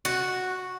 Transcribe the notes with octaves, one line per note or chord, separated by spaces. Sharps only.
F#4